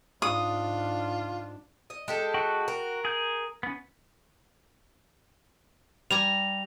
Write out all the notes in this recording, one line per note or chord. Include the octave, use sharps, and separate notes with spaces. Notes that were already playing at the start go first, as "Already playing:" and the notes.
G#2 D4 F4 D#6
D#5
G#3 G4 A4
F#4 F#5 G5
A#4
G#4 G6
B3 C#4
G3 G#5 A#5 F7